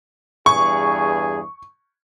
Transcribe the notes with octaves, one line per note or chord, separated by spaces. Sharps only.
E2 G2 G#4 C#6